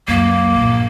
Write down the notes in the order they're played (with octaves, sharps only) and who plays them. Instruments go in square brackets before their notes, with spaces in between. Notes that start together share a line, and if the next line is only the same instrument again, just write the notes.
[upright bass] C#2 F#2 [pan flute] A#3
[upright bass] A#1 G2